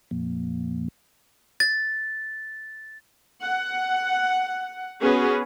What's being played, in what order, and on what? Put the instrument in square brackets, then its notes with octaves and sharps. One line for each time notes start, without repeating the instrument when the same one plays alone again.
[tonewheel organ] F2 A#2
[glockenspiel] A6
[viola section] F#5
B3 C#4 F#4 G#4 B4